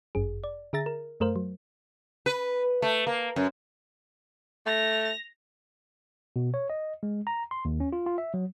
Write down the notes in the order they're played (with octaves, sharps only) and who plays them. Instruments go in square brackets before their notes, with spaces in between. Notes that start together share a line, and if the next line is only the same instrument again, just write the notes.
[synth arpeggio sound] G1 F#2 G#4
D5
D3 G#4 E5 A#5 A6 A#6
A#4
F#2 A3 A#4 C5 F5
F#3
[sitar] B4
A3
A#3
F#2
[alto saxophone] A3 [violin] A#6 F7
[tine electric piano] B2
C#5
D#5
G#3
A#5
C6
D#2
C#4
F4
F4
E5
F#3